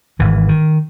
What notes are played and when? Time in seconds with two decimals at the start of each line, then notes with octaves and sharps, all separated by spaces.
0.19 G#1 G#2 E3
0.49 D#3